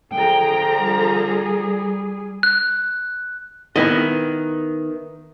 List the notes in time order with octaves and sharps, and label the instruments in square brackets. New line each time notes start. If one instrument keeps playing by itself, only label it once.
[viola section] D3 F3 A#5 [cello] G#4 G5
[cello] G3 G#4
[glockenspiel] F#6
[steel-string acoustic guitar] D#3 [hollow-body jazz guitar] B3 E4 D#5